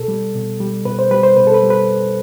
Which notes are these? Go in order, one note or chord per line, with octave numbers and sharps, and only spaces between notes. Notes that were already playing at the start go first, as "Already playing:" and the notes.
Already playing: B2 A4
G3
B2
G3
B2 B4
C5
G3 B4
C5
B2 B4
A4
B4
G3
B4